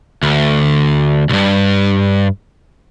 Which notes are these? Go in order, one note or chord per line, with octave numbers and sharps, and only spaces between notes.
D2
B1 G2